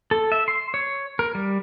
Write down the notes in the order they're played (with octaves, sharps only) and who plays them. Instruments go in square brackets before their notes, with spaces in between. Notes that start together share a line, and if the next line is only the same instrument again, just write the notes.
[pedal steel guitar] A4
E5
C6
C#5
A#4
G3